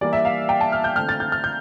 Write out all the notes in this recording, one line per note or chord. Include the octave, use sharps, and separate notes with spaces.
E3 G3 A#3 D5
E5
F5
G5
A5
F6
G6
D3 A3 C4 F6
A6
G6
F6
G6